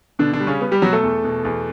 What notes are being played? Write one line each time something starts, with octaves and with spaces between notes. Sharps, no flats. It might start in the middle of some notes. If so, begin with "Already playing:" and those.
B2 D3 D4
D3 D4
G3
C#3 C#4
G3 B3
G3 G4
B2 F#3 F#4
A3 A4
E2
B2
E2